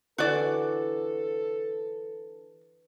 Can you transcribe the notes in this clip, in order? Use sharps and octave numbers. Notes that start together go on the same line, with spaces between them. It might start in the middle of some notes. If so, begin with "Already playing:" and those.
D3 E3 F#4 A4 D5